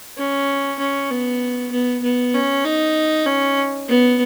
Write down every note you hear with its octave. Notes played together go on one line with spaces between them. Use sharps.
C#4
C#4
B3
B3
B3
C#4
D#4
C#4
B3